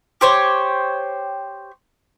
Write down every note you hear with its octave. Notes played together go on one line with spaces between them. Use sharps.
G4 C5 C#5